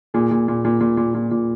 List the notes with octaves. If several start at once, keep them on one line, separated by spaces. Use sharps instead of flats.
A#2 G#4
A#2
A#2
A#2
A#2
A#2
A#2
A#2